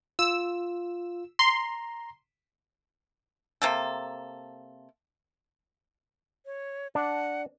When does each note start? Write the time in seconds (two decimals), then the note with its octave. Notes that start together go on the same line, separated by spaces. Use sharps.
0.19 F4 E6
1.39 A#5 C6
3.62 C3 A#3 A4
6.46 C#5
6.95 D4 F#5